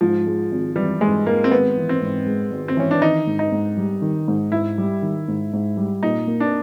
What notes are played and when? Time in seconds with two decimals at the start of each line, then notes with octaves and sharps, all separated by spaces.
0.01 G#2 F3
0.27 G#3
0.52 G#1
0.76 E3 G3
1.01 G#2 G#3
1.26 G#3 A#3
1.44 C4
1.51 G#1 B3
1.77 E3
1.89 C4
2.02 G#2
2.26 G#3
2.51 G#1
2.68 C4
2.77 E3 C#4
2.91 D4
3.01 D#3 D#4
3.27 G#2
3.39 D#4
3.52 G#2
3.77 G3
4.02 D#3
4.28 G#2
4.52 G#2 E4
4.78 G3
5.02 D#3
5.28 G#2
5.53 G#2
5.77 G3
6.03 A#2 D#4
6.27 A#3
6.40 D4